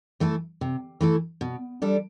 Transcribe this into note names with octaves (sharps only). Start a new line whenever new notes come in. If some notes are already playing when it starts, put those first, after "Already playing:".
E3 A3 E4 A4
C3
E3 A3 E4 A4
B2
G3 D4 A4